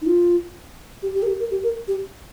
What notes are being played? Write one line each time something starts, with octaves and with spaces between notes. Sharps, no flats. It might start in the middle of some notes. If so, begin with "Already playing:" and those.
D#4
F4
G4
G4
A#4
G4
A#4
G4
A#4
G4